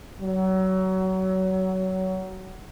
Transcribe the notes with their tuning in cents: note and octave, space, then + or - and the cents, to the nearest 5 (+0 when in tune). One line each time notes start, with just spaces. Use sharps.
F#3 +25